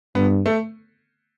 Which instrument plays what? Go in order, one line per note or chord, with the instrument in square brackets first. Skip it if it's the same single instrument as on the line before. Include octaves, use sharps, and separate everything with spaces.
[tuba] G2 [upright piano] B3
[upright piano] A3